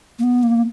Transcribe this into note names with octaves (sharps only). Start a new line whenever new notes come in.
A#3
B3
A#3